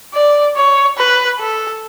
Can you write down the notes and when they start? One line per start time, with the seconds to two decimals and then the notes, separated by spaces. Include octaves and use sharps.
0.14 D5
0.56 C#5
0.98 B4
1.40 A4